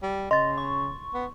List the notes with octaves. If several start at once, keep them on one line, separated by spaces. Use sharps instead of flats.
G3
C#3 D#5 C6 A6
C#6
B3